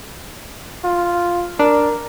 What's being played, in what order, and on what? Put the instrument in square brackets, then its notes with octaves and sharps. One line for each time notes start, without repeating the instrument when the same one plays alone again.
[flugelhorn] F4
[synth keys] D4 [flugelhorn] A#4